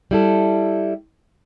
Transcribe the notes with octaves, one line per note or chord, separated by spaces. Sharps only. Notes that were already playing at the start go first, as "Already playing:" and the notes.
G3 E4 A4